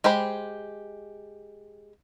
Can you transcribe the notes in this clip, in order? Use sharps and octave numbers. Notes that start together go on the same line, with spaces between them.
G#3 G4 C5 B5